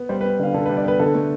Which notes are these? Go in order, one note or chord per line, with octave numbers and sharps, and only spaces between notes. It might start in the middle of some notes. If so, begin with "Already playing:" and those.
Already playing: B3
G3 C5
B4
B3
D3 F5
D3 A4
B4
G3
D5
B3 B4
D3 A4
A3